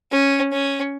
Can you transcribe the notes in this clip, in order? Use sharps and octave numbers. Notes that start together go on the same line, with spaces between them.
C#4
C#4